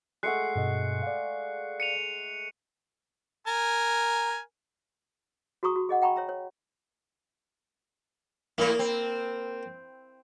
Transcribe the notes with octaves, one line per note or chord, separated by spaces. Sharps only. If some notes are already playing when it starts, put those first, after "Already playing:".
G#3 A3 F#5 F#6 C7 C#7
G2 B2 D#5
D5 F5
C#7 D#7 F7
A#4 G#5
F#4 G#4 A#5 C#6 D#6
F#4
G#4 D#5 F#5
F#5 G5 A#5 B5 C#6
C#5 E5 A#5
C#5
A2 A#3 E4 A#4
C4